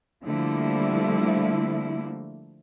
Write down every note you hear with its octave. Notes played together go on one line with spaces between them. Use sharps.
D3 F3 G3 A3 A#3 E4